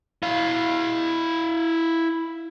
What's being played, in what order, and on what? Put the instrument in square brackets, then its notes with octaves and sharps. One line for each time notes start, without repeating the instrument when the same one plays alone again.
[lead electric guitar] E4 F5